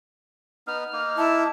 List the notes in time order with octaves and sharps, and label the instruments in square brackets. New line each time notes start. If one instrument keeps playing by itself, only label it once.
[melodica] B3 D#4 [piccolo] F6
[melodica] A#3 D#4
[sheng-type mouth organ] E4 [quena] A5